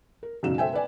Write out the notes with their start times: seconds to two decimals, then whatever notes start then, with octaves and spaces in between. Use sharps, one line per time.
0.23 A#4
0.43 E1 F#2 C#3 F#3 D#4 E7
0.58 A4 C5 E5 G5 G#5
0.73 B4 D5 G#5